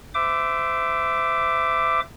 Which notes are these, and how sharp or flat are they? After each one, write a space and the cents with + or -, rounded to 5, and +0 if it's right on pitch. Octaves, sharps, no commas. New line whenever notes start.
C5 -35 E5 +10 D6 +0